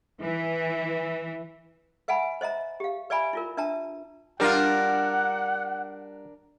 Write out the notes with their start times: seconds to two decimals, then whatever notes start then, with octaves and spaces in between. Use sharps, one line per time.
0.18 E3
2.08 B4 E5 F#5 G#5 B5
2.41 C5 D#5 E5 A#5
2.80 G4 F5
3.10 B4 D5 E5 G#5 B5
3.33 E4 F4 A#4
3.57 D4 B4 E5 A5 A#5
4.40 G3 D4 F4 A#4 F#5